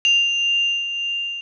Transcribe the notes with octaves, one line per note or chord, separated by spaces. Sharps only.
F7